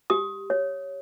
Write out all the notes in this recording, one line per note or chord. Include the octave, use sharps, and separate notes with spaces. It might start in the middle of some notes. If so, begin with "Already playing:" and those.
G4 D#6
C#5